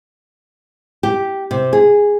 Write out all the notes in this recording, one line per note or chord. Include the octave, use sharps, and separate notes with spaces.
G4
C3
G#4